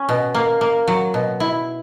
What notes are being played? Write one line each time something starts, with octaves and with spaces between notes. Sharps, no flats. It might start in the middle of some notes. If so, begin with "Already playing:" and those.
Already playing: C#4
B2
A#3
A#3
F#3
B2
E4